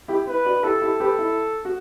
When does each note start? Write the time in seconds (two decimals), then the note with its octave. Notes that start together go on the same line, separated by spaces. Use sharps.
0.08 E4 G4
0.27 E4 B4
0.45 D4 F#4
0.63 E4 G4 A4
0.82 E4 G4
1.00 G4 B4
1.19 E4
1.65 F#4